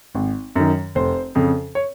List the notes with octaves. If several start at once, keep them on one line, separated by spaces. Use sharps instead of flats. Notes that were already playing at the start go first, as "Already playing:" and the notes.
G#1
F#2 D#3
F1 C5
F2 C#3
C#5